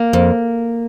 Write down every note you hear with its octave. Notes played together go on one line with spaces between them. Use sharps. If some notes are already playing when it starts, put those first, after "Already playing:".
Already playing: A#3
F2